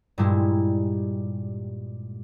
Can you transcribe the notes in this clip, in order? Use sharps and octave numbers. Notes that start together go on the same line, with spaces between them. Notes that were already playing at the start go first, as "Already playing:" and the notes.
G2 A#2 G3 G#3 E4